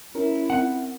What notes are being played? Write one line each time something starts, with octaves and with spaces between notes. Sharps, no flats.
C#4 E4 A#4
C4 F#5